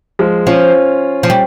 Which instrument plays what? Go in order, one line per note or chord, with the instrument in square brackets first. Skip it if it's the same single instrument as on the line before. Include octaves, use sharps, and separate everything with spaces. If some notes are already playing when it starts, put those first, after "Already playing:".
[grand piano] F3 G#3
[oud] F3 [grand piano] C#4 F4
[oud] F3
G3